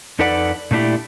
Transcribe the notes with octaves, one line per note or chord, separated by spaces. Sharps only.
F2 D#4 A4 B4 D5 F#5
A#2 A3 D4 E4 G4